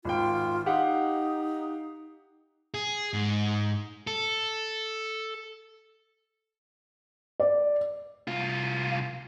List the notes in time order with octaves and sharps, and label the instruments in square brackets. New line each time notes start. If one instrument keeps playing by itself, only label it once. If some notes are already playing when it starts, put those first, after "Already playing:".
[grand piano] G#1 G5 [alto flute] F4
[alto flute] D#4 [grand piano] G4 F5 F#5
[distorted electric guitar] G#4
G#2
A4
[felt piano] D5
[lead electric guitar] C2 F4